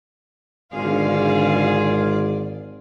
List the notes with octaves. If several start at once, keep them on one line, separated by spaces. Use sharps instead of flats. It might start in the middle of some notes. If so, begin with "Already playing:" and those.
G#1 B2 D3 F4 G#4 D5 F5